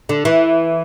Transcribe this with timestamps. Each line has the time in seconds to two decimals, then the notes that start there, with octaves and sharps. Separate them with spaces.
0.09 D3
0.25 E3